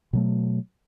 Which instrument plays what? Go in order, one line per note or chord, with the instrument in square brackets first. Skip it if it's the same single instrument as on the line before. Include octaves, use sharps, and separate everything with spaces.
[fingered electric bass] B2 F#3 A3